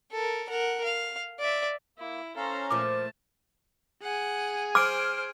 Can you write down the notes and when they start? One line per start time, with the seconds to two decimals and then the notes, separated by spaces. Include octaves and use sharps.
0.12 A4 A#4
0.49 A#4 F#5
0.84 F5
1.39 D5 E5
1.98 A#3 E4
2.36 C#4 A4 C5 F5 A#5
2.71 A#2 F3 A3 A5 D6
4.03 G#4 F#5 G#5
4.75 C5 D6 F6 D7